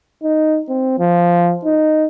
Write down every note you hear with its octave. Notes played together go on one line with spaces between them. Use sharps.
D#4
C4
F3
D#4